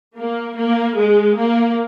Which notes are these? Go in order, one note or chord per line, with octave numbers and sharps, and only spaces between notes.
A#3
A#3
G#3
A#3